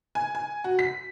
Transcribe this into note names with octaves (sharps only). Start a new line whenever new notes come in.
G#5
G#5
F#4
B6